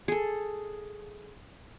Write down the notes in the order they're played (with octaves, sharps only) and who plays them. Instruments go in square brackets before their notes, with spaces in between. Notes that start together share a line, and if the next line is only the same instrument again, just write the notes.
[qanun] G#4 A4